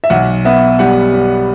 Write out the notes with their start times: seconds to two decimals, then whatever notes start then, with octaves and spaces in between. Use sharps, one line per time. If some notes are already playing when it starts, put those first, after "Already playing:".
0.04 E5
0.10 B1 F#5
0.45 B3 E5
0.79 G3 F#5
1.13 G3